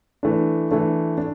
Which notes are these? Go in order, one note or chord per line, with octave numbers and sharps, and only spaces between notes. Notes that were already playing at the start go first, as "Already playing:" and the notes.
E3 A3 D4
E3 A3 D4
D4